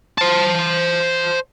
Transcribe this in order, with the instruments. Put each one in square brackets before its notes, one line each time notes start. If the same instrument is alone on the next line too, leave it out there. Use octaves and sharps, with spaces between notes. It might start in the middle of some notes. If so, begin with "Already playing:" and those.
[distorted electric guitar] C5 A5